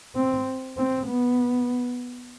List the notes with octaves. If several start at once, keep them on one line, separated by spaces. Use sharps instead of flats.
C4
C4
B3